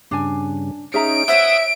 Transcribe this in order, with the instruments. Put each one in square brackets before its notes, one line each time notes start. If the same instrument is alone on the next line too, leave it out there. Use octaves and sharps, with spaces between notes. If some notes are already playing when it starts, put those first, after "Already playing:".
[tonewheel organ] G2 C#3 [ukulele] D4 G#5
[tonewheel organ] C#4 D#4 [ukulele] G#4 E5 A#5 [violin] D7
[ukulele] C5 C#5 [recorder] E5 [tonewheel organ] F#5 D#6 E6